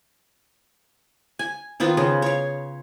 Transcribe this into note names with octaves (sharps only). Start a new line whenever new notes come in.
G#5
D#3 B3 C4 F4
C#3
C#5 F5